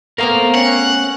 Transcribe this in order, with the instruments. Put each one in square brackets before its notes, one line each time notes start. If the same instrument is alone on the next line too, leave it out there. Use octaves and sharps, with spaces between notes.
[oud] A3 B3 C4 [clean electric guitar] A#4 F5 A#5
[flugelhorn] C#4 [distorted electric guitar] F#5